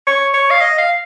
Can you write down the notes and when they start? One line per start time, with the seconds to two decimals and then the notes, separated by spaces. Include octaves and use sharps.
0.07 C#5
0.34 C#5
0.51 F5
0.61 D#5
0.78 F5